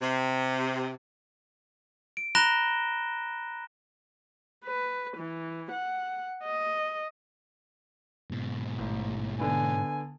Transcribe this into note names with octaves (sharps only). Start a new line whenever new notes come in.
C3
D7
A#5 B5 F#6 A#6 E7 G7
B4
E3
F#5
D#5
G#2 B2
A1
D3 B3 G#5